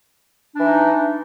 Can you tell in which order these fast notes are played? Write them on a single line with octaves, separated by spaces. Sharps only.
D4 E3 D#4